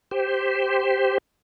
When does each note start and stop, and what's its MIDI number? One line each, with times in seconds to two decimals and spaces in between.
0.11 1.18 67
0.11 1.18 72